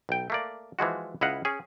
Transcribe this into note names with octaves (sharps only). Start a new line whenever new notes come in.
B1 G5
A3 A#3 D5
E3 F3 G#3 F#4
C#2 E4 D#5 F5 F#5
C#4 G#4